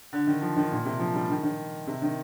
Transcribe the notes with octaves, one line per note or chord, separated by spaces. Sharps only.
D3
D#3
F3
D#3
A#2
C3
F3
G3
D#3
D#3
C3
D#3